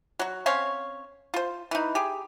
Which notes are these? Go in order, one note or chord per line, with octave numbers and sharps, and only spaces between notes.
F#3 F#4
C4 C#4 C#5 F5
F4 C5
E3 D#4
G4 G#4